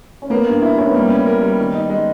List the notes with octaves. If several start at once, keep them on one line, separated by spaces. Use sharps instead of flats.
C#4
A#3 B3
G2
E4
C#4 E4
B3
G3 A#3
C#4
A#4
G3
D#3
D#4
G#3